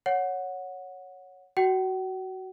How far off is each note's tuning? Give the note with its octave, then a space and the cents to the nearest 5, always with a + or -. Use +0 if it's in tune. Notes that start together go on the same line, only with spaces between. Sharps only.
C#5 +0 F#5 -10
F#4 +15 F#5 +45